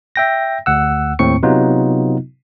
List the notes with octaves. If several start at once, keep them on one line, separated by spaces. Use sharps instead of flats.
E5 G5 A#6
D2 F#5 E6
D#2 A2 C4 C#6 C#7
C3 F#3 B3 D#4 F4